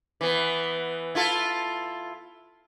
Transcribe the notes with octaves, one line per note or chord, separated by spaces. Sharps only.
E3 B3
E4 F4 A4